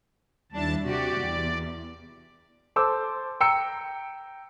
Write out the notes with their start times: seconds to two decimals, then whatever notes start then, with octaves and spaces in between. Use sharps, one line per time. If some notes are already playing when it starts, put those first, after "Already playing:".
0.52 D#2 G3 D4 E4 A5
0.84 C3 F#4 G4 D5
1.20 E2
2.76 A4 C5 A5 D6 E6
3.41 G5 A#5 E6 C#7